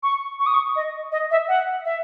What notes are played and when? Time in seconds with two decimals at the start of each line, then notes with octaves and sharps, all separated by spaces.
0.03 C#6
0.40 C#6
0.46 D#6
0.54 C#6
0.76 D#5
1.12 D#5
1.31 E5
1.48 F#5
1.85 E5